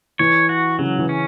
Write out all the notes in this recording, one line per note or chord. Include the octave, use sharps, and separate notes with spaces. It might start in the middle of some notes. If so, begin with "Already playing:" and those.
E3 C#5
F#4
C#3 F#3
E3
C#4